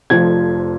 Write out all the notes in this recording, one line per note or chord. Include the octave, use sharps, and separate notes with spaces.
F1 F2 F3 G#6